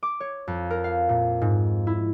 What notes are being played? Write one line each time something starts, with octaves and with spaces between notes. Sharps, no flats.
D6
C#5
F2
A#4
F5
A#2
G#2
E4